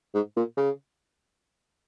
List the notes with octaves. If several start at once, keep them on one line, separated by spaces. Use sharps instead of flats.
G#2
A#2
C#3